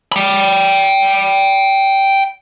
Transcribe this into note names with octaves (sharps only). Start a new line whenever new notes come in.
G5 B5